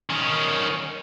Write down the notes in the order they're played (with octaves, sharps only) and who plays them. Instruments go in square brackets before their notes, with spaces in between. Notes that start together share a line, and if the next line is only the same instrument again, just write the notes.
[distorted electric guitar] D#3 C#4